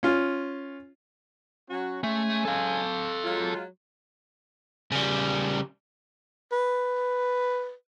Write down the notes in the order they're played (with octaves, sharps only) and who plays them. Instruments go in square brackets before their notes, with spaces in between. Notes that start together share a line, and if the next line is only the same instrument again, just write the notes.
[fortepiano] C#4 F4
[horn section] F#3 C#4 F#4
[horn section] G#3 C#4 G#5 [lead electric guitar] A3
[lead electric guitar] A4 F5
[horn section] F#3 G#3 F4
[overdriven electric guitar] C#3 G3
[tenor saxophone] B4